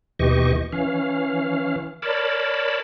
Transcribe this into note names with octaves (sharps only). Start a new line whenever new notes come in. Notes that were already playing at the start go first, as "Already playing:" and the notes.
D#2 B2 E3 G4 D#5 C#6
E3 C#4 F5
A#4 C#5 D5 A5 B5